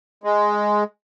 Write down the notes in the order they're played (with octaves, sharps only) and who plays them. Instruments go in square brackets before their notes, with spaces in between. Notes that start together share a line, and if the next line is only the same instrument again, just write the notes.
[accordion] G#3